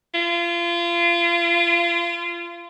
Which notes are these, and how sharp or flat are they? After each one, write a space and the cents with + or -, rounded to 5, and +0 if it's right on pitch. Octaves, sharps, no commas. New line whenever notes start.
F4 -30